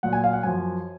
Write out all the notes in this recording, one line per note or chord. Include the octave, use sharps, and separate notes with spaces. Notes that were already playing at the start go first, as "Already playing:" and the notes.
A#2 F#3 F#5
G#5
F5
F#5
F#2 F3 G#5